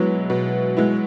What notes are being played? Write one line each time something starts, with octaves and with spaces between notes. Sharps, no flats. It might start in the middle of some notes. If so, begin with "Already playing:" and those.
Already playing: B2 F#3 G#3 B3 E4
B2
G#3 B3 E4